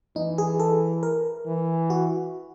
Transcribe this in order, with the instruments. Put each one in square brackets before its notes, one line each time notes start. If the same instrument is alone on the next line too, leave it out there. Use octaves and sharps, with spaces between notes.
[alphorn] E3 [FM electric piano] D#4
[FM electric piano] G#4
A4
A#4
[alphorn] E3
[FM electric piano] F#4